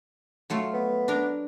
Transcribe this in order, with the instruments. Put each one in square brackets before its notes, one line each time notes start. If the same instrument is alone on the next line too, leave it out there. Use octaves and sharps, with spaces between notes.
[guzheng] F#3 A3 F4
[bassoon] B3
[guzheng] D4 A#4